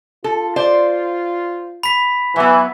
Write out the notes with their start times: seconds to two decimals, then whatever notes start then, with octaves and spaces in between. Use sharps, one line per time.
0.24 F4 A4
0.56 C5 D5
1.83 B5 B6
2.36 E3 F#3 B3